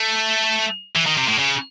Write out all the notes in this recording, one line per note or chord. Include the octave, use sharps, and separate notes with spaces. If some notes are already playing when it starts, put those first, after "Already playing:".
Already playing: A3
E3
D#3
C3
A2
C#3